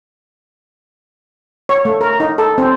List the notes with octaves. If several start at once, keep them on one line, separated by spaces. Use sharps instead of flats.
C#5
A3
A#4
D#4
A4
C4